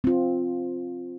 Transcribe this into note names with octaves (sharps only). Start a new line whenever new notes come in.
C4 F4